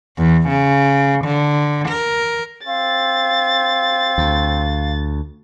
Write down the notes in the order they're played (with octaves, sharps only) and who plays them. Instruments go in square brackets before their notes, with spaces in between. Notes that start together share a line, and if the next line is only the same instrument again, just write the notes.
[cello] E2
C#3
D3
A#4
[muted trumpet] C4 [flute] F5 [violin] A6
[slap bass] D2